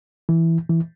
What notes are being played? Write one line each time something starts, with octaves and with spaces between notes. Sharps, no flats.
E3
E3